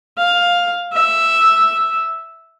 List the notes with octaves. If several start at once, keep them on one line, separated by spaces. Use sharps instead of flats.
F5
E5